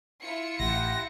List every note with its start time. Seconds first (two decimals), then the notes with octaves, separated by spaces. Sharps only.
0.23 E4 F4 C#7
0.59 A1 G4 F#5 C6 A#6